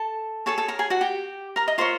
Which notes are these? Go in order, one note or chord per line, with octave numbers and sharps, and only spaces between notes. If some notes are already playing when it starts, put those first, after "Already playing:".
Already playing: A4 A5
G#4 A4 C#5 A5
A4 A5
A#4 A#5
G#4 G#5
F#4 F#5
G4 G5
A#4 A#5
D#5 D#6
F4 A#4 C5 C#5 C6